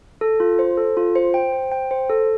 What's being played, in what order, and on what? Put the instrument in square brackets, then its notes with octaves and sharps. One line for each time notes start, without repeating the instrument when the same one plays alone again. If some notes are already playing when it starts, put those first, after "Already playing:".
[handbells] A4
F4
C5
A4
F4
C5
G5
C5
G5
C5
A4